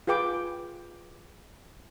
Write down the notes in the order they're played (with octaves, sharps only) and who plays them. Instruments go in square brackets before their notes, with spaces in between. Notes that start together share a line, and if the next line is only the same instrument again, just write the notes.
[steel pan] F4 G#4 B4 G5 D6